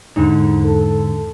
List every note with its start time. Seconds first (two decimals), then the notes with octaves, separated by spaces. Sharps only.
0.16 E2 G#2 D3 D#4
0.65 A4